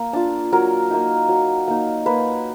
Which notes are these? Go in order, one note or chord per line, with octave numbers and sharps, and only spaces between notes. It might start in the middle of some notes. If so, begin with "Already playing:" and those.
Already playing: A#3
D4 F4
F#3 A#4
A#3 D#4
F#3
A#3 D#4
A#3 B4